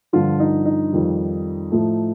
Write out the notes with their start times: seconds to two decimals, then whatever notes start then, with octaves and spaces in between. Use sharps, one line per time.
0.13 G2 D3 F3 F4
0.40 D#4
0.65 D#4
0.92 F2 D#3 G3
1.72 A2 F3 A3